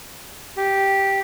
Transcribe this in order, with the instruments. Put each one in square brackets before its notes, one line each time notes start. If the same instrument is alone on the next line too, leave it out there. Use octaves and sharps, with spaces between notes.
[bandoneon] G4